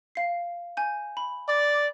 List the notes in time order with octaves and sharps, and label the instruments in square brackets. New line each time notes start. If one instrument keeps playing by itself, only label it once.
[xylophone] F5 C7
G#5 G6
B5
[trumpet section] D5